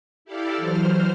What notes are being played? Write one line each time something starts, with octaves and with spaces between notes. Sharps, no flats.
E4 G4 A4 D5 F5
E3 F#3 C5 F6